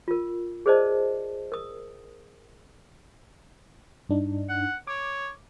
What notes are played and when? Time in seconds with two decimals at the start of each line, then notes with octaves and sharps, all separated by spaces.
0.08 F4 A#4
0.66 G#4 A#4 C5 D5 D#5 A5
1.52 A#4 D#6
4.09 G2 D4 D#4
4.49 F#5
4.87 C#5 D6